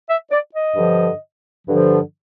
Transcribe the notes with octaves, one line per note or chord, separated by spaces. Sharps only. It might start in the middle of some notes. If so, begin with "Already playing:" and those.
E5
D5
D#5
G2 D3 F3
G2 D3 F3